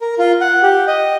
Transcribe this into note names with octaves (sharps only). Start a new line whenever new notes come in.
A#4
F4
F#5
G4
D#5